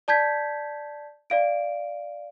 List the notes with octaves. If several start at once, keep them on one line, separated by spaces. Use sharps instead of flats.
D5 A5 G6 G#6 B6
D5 F5 D7